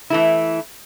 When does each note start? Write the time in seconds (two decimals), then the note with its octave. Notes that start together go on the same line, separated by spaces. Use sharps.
0.10 E3 A3 E4